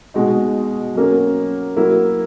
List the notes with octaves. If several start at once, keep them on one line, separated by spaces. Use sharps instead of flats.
B2 G#3 D#4 F#4
F#3 A#3 C#4
F#3 A#3 E4